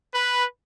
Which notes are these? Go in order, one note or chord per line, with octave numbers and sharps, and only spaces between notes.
B4